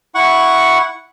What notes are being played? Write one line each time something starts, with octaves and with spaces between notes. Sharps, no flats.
E4 F#5 C#6